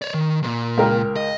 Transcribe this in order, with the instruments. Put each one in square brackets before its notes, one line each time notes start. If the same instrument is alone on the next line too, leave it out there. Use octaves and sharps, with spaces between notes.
[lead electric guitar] C#5 D5
D#3
D#2 A#2
[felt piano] C#2 A#4 G5
[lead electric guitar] D#5